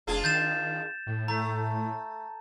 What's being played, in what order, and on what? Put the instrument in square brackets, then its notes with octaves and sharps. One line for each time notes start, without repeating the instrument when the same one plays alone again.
[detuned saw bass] F1 [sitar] D4 F4 G#4
[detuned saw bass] D#3 [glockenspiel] G6 A6 E7
[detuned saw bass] A2
[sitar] A3 [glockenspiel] A#5